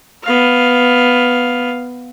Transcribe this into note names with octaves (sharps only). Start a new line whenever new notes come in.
B3 F5